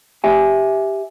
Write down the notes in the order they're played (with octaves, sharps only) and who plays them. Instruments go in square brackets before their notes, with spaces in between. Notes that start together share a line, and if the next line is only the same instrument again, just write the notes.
[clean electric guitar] G4 E5 G#5